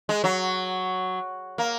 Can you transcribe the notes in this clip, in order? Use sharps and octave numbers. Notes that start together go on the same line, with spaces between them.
G#3
F#3
A#3